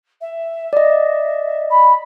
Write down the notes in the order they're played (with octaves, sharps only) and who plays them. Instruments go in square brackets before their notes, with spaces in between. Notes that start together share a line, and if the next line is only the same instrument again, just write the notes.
[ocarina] E5
[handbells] D5 D#5
[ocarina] B5